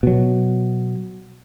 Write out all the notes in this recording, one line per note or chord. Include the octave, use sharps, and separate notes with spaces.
B2 F#3